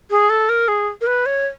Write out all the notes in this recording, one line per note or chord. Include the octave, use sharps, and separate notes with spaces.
G#4
A4
A#4
G#4
A#4
B4
C#5